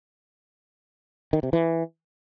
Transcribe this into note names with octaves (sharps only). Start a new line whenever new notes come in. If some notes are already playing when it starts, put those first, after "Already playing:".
D#3
C3
E3